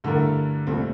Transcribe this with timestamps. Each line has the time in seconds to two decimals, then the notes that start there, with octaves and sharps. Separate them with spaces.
0.04 G2 D3 A3 E4 A#4
0.67 C2 A#2 A3 C4